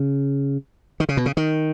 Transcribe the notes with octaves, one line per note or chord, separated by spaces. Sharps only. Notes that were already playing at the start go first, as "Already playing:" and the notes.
Already playing: C#3
D#3
C#3
B2
C#3
D#3